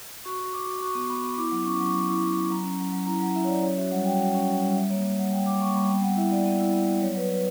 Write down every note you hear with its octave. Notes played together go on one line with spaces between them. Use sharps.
F#4 C#6
F#4
F#4 D6
F#4
F#4 C#6
B3
B3 B5
B3
E4 D6
F#3
C#4 C#6
D6
F#3 C#6
F#3 B5
E4
F#3
F#3
F#3 A#5
C#4
F#3
F#3
E4 A#5
F#3 F#5
E4 E5
C#5
F#3 D5
C#4 C#5
F#4 E5
G3 F#5
F#4 G5
F#4 F#5
C#4
F#4
G3
G3 E5
A#3 C#5
G3
G3 F#5
G3 G5
G3 D6
A#3 C#6
G3 B5
B3 G5
B3 F#5
E4 E5
B3 D5
B3
E4
B3
B3
F#3 C#5
F#3 B4
F#3 B4